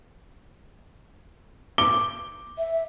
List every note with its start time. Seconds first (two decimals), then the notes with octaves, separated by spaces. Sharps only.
1.78 D6 G7
2.58 E5